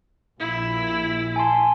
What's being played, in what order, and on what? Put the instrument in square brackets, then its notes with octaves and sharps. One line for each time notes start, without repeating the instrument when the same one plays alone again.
[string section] A#1 [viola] E4
[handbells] G#5 A5 C6